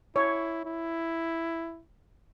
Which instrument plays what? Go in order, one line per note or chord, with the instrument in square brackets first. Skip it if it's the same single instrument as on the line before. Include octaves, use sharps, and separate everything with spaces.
[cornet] E4 [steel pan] C#5
[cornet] E4